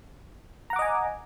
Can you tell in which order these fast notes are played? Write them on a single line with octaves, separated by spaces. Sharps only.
A#5 F#5 D6 D#5 G#5